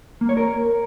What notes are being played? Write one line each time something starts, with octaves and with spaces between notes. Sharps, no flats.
A#3
C#5
A#4